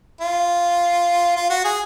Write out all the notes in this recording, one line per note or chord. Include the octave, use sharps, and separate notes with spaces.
F4
F4
F#4
G#4